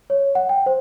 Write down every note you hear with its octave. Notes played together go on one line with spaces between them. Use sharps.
C#5
F#5
G5
C5